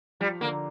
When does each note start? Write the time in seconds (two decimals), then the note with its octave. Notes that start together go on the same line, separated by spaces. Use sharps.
0.20 F3 G3
0.41 D3 A#3